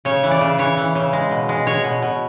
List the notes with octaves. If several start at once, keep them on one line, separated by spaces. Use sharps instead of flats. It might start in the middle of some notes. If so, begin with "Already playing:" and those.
C#3 C#5
E3
D5
C#3
E3 C#5
E3
C#3
G#3
B2
G#3
G#3 C#5
B2
B2